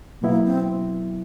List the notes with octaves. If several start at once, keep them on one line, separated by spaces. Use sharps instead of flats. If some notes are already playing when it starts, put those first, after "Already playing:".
B2 F#3 A#3 B3 E4
C4